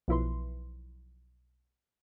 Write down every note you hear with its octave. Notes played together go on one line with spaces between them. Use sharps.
B1 F3 E4 B4 C6